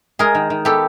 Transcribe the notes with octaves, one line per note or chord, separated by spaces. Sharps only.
G#3 G#4 A#4
D#3
D#3
B3 G4 A4